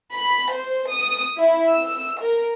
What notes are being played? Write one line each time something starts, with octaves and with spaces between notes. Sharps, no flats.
B5
C5
D#6
E4
E6
A#4